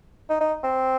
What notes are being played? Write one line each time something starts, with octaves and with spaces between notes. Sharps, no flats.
D#4
D#4
C4